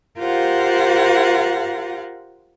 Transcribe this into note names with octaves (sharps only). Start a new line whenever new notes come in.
F4 G4 A#4 C5 F5 F#5